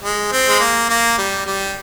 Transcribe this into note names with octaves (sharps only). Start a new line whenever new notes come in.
G#3
C4
G#3
A#3
A#3
G3
G3